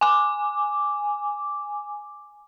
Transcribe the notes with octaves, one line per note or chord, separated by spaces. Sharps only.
G#5 D6